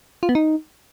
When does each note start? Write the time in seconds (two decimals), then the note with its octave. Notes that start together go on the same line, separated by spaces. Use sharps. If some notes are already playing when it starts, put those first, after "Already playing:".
0.23 F4
0.29 B3
0.35 D#4